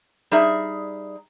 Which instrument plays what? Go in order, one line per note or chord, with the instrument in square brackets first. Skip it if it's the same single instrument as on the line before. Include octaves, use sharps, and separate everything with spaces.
[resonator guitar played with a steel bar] G3 D#4 G#4 E5